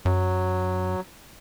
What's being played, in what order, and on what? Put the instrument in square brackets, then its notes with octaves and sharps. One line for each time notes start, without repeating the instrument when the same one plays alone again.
[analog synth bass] F#2 [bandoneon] F#3